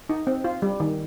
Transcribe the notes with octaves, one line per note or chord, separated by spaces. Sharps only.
D#4
C4
F4
G3
D#3